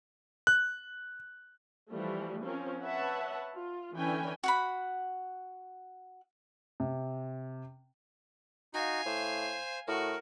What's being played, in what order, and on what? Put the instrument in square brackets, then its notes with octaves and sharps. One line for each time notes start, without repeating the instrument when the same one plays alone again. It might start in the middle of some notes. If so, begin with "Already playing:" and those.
[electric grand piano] F#6
[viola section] E3 F3 G3 A3
F3 C4 C#4 A#4
B4 C#5 E5 F#5 A5
F4
D3 E3 C#4 D4 G5 G#5
[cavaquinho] F#4 F#5 B5
[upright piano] C3
[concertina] D#4 F#4 [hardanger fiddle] F5 G#5
[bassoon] A2 [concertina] C5
[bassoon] A2 [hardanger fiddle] F#4 [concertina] A#4